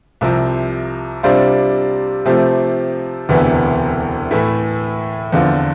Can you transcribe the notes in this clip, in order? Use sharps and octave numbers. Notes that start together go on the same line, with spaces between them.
C2 C3 F3 C4
C3 G3 D4 F4 C5
C3 F3 A3 C4 G4
E1 D2 C3 E3 B3
A2 E3 A3 E4
E2 D3 F3 C4 F4